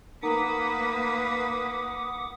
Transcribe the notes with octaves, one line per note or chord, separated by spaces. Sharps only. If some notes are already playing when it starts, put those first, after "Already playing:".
A#3 D#4 A#4 B4 F#5 A#5 D6 D#6